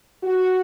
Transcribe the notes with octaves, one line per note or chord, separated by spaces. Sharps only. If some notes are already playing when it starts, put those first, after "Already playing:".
F#4